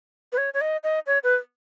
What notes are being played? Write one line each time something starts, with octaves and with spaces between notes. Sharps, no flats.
B4
C#5
C#5
D#5
D#5
C#5
B4